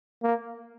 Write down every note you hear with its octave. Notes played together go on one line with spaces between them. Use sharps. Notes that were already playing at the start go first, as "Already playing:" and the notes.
A#3